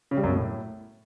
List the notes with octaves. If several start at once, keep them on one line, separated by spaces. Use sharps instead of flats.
C#3
G3
F#2
B2
A2